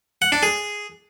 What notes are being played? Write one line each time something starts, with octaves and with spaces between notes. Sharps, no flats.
F#5
D4
G#4